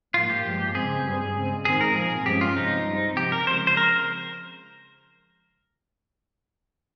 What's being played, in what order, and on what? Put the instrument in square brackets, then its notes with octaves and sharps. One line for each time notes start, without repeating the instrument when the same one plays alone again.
[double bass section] G#2 F3 A#3 [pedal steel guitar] F4
[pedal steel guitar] G4
[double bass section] G2 F3 G#3
[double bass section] C#3 G#3 C4 [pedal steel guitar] G#4
[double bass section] G2 G3 C4
C#3 G#3 C4
[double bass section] G#2 D#3 G#3 C4 [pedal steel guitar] G#4
[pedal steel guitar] A#4
[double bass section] A#2 F3 C4 [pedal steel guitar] G#4
[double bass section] G2 F3 G#3 C#4 [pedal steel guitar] G4
[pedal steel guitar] F4
[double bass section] C3 F3 G#3 C4 [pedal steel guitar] D#4
[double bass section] G2 G3 C4
[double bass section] C3 F3 C4 [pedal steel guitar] G4
[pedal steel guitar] A#4
[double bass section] C#3 F3 G#3 C4 [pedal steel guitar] C5
[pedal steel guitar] C5
A#4